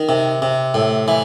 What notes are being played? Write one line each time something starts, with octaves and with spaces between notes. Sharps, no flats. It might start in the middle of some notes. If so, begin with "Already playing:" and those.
Already playing: D#3
C3
C3
A2
E3